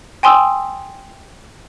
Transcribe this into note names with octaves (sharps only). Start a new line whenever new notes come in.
G5 G#5 C6 D#6 E6